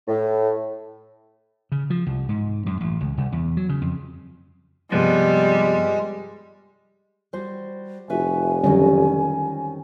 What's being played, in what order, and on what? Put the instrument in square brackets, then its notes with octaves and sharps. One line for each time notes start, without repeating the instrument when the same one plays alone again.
[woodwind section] A2
[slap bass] C#3
F3
C2
G#2
F#2
A1
C#2
C2
E2
F#3
C#3
F2
[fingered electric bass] G2 C3 C4 [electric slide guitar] F3 B3 [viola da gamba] G3 [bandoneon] G#3
[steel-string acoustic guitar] G3 F#4 C5
[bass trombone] F1 [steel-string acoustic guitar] F#4 B4 E5 [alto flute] G#5
[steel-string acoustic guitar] F2 D#3 F#3 [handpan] D3 G3 C#4